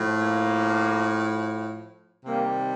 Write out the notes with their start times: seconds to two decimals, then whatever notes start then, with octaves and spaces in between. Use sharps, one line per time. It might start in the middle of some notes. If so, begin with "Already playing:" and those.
Already playing: A2 F3
0.19 A#3
2.25 C3 D#3 G3 A#3